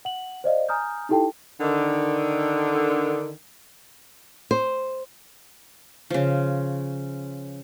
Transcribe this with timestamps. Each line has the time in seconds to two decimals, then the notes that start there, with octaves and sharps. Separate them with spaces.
0.05 F#5 F#7
0.44 C5 D5 D#5 F5
0.69 G#5 A#5 D#6 F6 G6
1.09 D#4 E4 G4 A4 G5 A5
1.61 D3 D#3
4.51 C5
6.10 C#3 F3